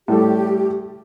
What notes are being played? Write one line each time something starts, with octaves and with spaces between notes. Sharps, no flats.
A2 G3 G4 A4